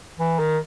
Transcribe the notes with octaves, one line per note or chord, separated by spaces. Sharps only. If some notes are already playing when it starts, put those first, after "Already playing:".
E3
D#3